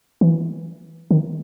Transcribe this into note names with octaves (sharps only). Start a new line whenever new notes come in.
E3
D#3